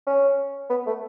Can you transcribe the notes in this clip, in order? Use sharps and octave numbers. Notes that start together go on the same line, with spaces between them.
C#4
B3
A3